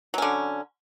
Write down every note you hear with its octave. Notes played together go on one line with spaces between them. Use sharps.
D3 F#3 C#4